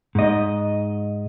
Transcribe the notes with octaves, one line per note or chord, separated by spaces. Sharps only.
G#2 D#5